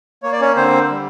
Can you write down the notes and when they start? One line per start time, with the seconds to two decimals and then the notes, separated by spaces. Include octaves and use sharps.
0.23 A#3 C#5
0.33 D5
0.41 C#4 C#5
0.56 D3 C4 C5
0.90 G3